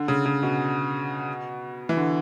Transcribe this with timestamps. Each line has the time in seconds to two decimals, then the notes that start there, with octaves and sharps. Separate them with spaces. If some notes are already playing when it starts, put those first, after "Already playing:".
Already playing: D3
0.08 C#3
0.26 C#3
0.43 B2
1.89 E3
1.97 D3